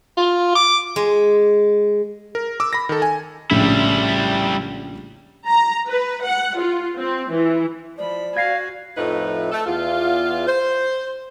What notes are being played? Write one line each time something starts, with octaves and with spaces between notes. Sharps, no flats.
F4
D6
G#3
A#4
D6 E6
B5 A#6
D#3 A4
G#5
A#1 A2 C#3 G3 E4
A#5
B4
F#5
F4
C4
E3
F3 D5 B5
F#4 F5 G#5 G#6 A#6 C7
F2 A2 F3 A3 D#4 B4
A3 A4
E2 F4
C5